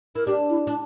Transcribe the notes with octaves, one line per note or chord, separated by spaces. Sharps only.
E4 A#4
D4 G4
E4
D4